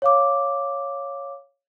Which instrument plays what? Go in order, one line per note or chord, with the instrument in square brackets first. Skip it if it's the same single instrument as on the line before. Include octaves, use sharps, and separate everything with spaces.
[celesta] C#5 F5 D6